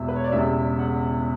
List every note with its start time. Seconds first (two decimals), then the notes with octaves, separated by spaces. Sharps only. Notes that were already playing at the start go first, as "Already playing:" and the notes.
Already playing: E1 E2 B2 G3 E5
0.08 B4
0.16 C#5
0.24 D5
0.32 E1 E2 C#3 G3 E5
0.79 F#5